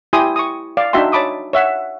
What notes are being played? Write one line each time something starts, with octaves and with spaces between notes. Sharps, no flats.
E4 G4 G5 G#5 C6 D#6
C#6 D#6
D5 F5
D4 D#4 F#4 E5 G5 C6
C#5 A5 B5 D6 D#6
C#5 E5 F#5